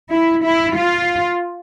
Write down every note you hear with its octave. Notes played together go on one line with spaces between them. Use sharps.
E4
E4
F4